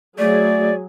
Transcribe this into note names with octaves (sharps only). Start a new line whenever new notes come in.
F#3 A3 G#4 D5